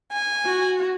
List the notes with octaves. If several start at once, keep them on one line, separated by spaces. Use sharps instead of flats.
G#5
F#4